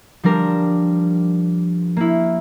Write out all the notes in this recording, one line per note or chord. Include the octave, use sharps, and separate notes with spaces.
F3 G3 D4 A#4
A#3 E4